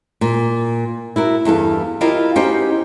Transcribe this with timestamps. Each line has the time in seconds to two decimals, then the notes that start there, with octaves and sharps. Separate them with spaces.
0.21 A#2
1.16 E4 F#4 A#4
1.45 E2 G2 A4 F5
2.01 E4 F4 G4 A#4 D#5 F5
2.36 B3 C#4 D#4 F#4 G4 C5